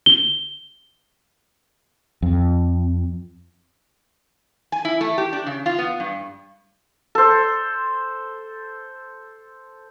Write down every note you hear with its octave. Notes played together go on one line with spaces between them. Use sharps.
G7
F2
G#5
E4
A3
G4
D4
C#3
F4
B3
G2
A4 C5